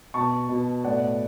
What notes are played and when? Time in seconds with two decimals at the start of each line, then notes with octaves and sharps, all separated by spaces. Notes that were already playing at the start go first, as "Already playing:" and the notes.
0.14 B2 A5 C#6
0.49 B2
0.84 A2 D5 F#5